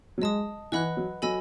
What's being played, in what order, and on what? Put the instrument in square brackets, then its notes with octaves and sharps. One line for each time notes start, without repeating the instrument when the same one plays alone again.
[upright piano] F#3
[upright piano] G#3 [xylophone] D#5 A5 D#6
[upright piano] E3 [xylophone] B4 D#5 F#5 B5 F#6
[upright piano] F#3
[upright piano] F#3 [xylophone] A4 D#5 G#5 B5 E6